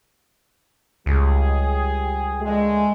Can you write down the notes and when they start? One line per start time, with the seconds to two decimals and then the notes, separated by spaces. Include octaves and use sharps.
1.06 C#2 G3 G4 G#4
2.42 A#1 D3 G#3 A3